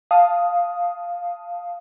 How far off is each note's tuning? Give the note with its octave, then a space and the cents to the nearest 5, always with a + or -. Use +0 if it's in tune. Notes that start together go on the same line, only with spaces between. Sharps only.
F5 +10 A5 +0 D#6 +5